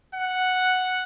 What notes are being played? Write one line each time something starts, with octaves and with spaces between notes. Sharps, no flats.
F#5